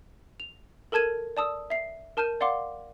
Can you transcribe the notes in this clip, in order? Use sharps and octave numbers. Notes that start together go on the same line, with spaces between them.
F7
A4 A#4 A5 G#6 D#7
D5 A5 D#6 E6
E5 C7
A#4 A5 F6 G6 D#7
D5 F5 F#5 C6 D6